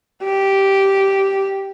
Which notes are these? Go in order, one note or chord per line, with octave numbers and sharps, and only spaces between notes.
G4